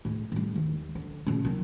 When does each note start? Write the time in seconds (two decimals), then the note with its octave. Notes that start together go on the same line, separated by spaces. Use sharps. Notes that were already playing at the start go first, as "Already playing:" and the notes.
0.05 A2 G#3
0.32 A2 G3
0.55 D#2 D#3
0.95 D3
1.27 A#2 C#3
1.45 D#3 F#3